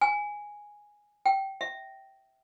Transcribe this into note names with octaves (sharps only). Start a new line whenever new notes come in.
G#5
G5
E5